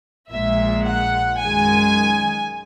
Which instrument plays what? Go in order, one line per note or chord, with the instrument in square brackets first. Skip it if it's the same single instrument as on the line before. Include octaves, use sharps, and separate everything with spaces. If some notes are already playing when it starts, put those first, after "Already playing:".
[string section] A#1 A#2 G#3 E5
F#5
F#2 D#3 G#3 G#5